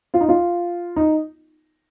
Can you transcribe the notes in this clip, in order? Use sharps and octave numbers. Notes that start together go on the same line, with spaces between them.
F4
D#4
F4
D#4